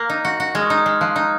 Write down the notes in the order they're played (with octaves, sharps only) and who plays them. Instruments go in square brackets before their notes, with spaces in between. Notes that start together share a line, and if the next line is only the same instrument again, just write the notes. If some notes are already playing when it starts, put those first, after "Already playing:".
Already playing: [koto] A#3 [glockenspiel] F#6 A#6
[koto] D#4
F#4
F#4
[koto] G#3 [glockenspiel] F6 G#6
[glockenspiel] D#6
C#6
[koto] D#4
[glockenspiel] D#6
[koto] G#3 [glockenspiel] F6
[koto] F3 [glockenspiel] F#6
[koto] D#4